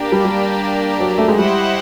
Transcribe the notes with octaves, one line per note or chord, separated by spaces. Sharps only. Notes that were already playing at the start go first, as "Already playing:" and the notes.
Already playing: A#3 D4 G4 A#4 D5
G3
G3
F#3
A3
G#3
G3 E4 G4 C5 D#5 F#5